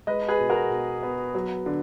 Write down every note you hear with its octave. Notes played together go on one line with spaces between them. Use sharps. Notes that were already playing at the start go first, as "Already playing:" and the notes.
G#3 B4 D#5
G#4 B4
B2
F#4 A#4
B2
B3
F#3
D3